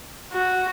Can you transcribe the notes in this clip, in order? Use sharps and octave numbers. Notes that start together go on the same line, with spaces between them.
F#4